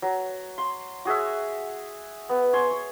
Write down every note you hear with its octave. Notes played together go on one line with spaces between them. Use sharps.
F#3
C6
F#4 G#4 C#5 E5
B3
C#5 G#5 C6
C#5